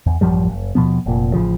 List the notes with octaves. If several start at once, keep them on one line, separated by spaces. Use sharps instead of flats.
E2
A1 F#2 F3 G3
F#1
D#2 B2 F3 B3
F1 A#2
A1 C#3 F3